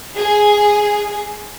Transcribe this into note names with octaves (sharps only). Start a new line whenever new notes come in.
G#4